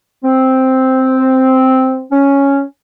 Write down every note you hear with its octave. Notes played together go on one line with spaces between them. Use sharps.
C4
C#4